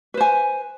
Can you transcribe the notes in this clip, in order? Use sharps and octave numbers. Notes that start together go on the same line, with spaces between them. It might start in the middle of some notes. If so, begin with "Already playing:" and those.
B4 C5 G#5